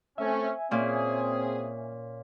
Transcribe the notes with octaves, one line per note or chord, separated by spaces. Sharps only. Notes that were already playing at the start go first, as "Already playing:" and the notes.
A3 C4 C#4 E5 G#5
A#2 C4 C#4 G#4